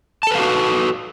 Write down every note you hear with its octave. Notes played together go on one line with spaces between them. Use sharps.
F#4 A4 B4 F5 A5